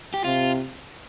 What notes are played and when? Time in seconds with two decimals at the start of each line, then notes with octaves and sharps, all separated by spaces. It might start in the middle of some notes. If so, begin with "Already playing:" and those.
0.14 G4
0.24 C3 F4